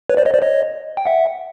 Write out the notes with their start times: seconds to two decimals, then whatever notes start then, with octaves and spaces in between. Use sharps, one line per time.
0.09 B4 C#5
0.17 C5 D5
0.25 C#5 D#5
0.34 C5 D5
0.42 C#5 D#5
0.97 G5
1.06 E5 F#5